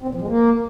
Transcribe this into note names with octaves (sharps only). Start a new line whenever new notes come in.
C4
A#2
F3
G#3
A#3